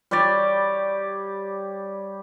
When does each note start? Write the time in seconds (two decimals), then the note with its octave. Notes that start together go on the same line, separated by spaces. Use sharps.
0.11 G3 G4 C#5 D5